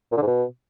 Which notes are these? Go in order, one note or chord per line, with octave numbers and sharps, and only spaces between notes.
A#2
D3
G#2
B2